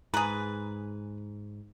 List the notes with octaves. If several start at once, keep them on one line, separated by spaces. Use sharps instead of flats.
G#2 G#4 B4 A#5